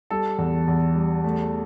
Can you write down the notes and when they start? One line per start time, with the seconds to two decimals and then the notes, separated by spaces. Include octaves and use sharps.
0.11 G3 A4
0.38 E2
0.68 E2
0.95 G3
1.24 A3